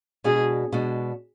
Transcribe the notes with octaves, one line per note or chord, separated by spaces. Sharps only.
B2 G#3 D4 F#4 G#4
B2 G#3 D4 F#4